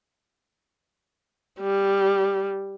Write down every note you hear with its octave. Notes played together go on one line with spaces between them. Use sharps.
G3